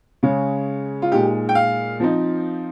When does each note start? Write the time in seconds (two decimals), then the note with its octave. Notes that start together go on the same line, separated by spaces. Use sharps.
0.23 C#3 G#3 C#4
1.02 F4
1.11 A#2 G#3 D#4 G4
1.49 G5
1.55 F5
2.00 F3 C4 D#4